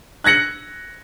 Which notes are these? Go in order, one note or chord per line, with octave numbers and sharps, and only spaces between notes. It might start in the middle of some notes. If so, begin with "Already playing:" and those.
F#6 G#6 A#6 C#7 F#7